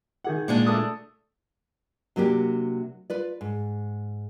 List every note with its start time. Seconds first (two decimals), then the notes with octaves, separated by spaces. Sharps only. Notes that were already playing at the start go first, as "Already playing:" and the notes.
0.24 D#3 G#4 F#5
0.48 A#2 G#3 D4
0.67 A3 D#6
2.16 C3 F#3 A#3 D4 G4
3.10 F4 B4 D5
3.41 G#2